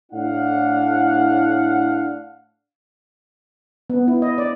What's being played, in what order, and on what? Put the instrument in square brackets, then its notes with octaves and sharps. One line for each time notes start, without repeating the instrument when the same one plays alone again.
[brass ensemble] A2 D4 E4 F5 F#5
[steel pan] B3
E4
D#5
D5